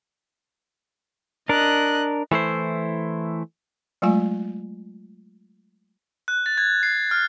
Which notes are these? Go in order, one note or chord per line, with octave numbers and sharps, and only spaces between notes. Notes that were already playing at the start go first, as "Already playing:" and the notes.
D4 A#4 D#5 F#6
E3 A3 E4 C5
F#3 G#3 A3 F4 G#5
F#6
A6
G#6
C7
F6